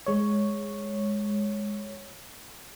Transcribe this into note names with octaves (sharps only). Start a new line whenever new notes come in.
G#3 C#5